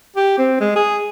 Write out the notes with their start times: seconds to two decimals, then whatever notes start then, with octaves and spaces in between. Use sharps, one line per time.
0.16 G4
0.38 C4
0.60 G#3
0.76 G#4